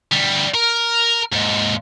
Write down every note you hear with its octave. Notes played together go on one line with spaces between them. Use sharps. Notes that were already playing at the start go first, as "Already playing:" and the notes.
D2 G3
A#4
D#2 G#2